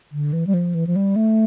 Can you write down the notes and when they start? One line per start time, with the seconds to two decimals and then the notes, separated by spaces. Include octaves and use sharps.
0.12 D3
0.33 E3
0.47 G3
0.54 F3
0.75 E3
0.87 F3
0.96 G3
1.16 A3